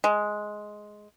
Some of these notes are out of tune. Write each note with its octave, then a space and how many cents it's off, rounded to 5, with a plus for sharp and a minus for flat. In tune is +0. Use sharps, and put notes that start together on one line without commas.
G#3 +10